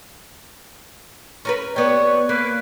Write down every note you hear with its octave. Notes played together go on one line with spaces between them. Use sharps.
C#4 A#4 B4
B3 G4 C#5 D5
A#3 B4